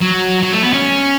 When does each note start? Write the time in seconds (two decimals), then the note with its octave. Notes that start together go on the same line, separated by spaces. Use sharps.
0.02 F#3
0.43 F#3
0.53 A3
0.62 B3
0.73 C#4